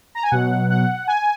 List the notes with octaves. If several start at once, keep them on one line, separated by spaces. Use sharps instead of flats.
A#5
G#5
B2 F#3 F#5
F#5
G#5